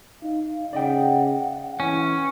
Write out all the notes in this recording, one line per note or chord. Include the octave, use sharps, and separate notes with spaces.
D#4 F5
C#3 D5 D#5 F#5 G5
E3 C#4